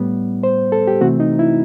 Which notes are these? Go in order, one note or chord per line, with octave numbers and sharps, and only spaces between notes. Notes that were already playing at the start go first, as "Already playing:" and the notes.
Already playing: A2 G3 B3
C5
A4
G4
C3 E3 A3 C4 F#4
D#4
E4